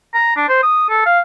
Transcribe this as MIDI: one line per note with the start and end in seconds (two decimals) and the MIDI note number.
0.14 0.35 82
0.36 0.48 62
0.48 0.59 72
0.63 0.89 87
0.90 1.04 69
1.06 1.20 77